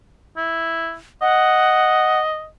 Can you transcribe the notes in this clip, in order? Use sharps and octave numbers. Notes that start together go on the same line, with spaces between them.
E4
D#5 F#5